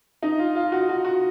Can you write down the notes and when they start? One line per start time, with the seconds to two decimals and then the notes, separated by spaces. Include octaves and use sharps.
0.22 D#4
0.39 F4
0.55 F4
0.72 F#4
0.89 F#4
1.04 F#4